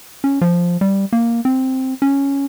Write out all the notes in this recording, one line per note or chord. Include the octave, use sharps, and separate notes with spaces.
C#4
F3
G3
A#3
C4
C#4